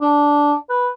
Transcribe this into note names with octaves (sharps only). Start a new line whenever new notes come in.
D4
B4